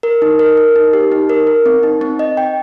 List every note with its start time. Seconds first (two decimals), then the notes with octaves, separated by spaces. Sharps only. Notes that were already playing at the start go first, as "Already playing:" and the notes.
0.03 A#4
0.22 D#4
0.39 A#4
0.57 A#4
0.76 D#4
0.93 G4
1.12 D#4
1.29 A#4
1.47 A#4
1.66 C4
1.83 D#4
2.01 C4
2.19 D#5
2.37 G5